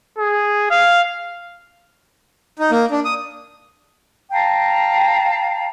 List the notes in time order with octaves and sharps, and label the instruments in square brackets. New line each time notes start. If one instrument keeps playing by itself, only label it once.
[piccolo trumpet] G#4
F5
[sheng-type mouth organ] D#4
A#3
D4
D#6
[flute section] F5 G5 A5 A#5